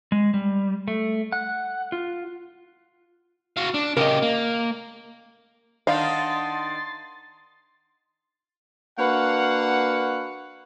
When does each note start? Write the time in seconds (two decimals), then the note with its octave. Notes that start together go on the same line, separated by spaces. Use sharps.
0.12 G#3
0.34 G3
0.88 A3
1.32 F#5
1.92 F4
3.57 F#4 F5
3.74 D4
3.97 C#3 G4 A#4 D#5
4.22 A#3
5.87 D#3 D4 D#4 F5 F#5 A5 C6 A6
8.98 A#3 D4 F#4 B4 F5 F#5